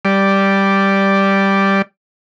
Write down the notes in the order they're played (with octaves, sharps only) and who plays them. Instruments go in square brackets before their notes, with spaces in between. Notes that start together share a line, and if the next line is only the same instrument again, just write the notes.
[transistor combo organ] G3 D5